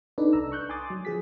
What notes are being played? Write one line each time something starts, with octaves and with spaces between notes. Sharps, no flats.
D4 D#4 A4 B4 D5
C2 A#5 E6
C#6 F#6 G6
G#5 C6 D6 D#6 A6
F#3
F3 G#4 B6